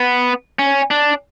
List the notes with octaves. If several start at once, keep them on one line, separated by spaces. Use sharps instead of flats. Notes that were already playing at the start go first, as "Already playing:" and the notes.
Already playing: B3
C#4
D4